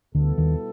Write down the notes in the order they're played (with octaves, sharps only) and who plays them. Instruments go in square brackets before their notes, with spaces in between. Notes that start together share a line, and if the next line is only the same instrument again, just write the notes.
[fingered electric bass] D2 D3 [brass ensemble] B2 G3 B3 E4 A4
[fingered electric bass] D#2 D#3